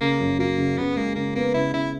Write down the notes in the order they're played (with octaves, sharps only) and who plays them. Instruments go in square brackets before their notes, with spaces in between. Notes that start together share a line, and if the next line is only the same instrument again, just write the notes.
[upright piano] C#3 [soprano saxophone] A#3
[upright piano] F#2
[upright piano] F#3 [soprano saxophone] A#3
[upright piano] C#3
[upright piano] C#3 [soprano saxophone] B3
[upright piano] G#3 [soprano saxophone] A#3
[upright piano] C#3 [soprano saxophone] A#3
[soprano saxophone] A#3 [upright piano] B3
[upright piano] C#3 [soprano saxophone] E4
[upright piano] C#3 [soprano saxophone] E4